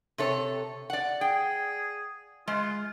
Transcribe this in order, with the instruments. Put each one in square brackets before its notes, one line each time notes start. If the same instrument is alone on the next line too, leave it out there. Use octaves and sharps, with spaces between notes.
[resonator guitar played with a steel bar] C3 A4 C#5
D5 F#5
[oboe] G#4 [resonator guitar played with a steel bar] G5
[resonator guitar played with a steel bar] G#3 [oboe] F4